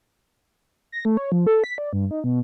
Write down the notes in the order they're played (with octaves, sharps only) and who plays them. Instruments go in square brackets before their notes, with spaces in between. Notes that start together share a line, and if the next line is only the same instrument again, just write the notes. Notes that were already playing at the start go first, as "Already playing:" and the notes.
[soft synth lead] A#6
A3
C#5
F3
A4
B6
D5
G2
D#4
B2